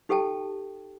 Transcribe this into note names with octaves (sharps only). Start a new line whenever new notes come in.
D#4 G4 A4 G5 A5